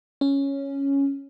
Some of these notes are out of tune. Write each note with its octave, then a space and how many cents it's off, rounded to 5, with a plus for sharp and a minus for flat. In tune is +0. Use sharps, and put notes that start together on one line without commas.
C#4 +0